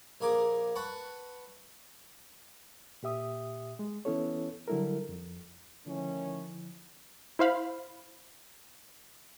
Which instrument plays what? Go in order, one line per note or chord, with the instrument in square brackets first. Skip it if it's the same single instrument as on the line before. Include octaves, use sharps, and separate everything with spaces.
[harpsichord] A#1 A#3 G#4 A#4 D6
B4 F#5 A5 C#6
[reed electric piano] A#2 G4 E5 D#6
G#3
E3 B3 C#4 E4 A4 C#5
D3 F#3 G3 E4 A4 A#4
F2
[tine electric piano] D3 F3 E4 [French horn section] D#3 A3 C#4
[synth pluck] E4 C5 F5 B5